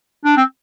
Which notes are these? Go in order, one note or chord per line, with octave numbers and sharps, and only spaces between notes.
D4
C4